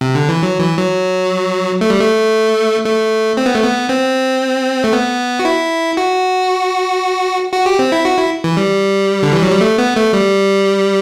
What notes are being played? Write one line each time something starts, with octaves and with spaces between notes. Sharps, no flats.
C3
D3
E3
F#3
E3
F#3
A3
G3
A3
A3
C4
B3
A3
B3
C4
A3
B3
F#4
E4
F#4
F#4
G4
C4
E4
F#4
E4
E3
G3
D3
E3
F#3
G3
A3
B3
A3
G3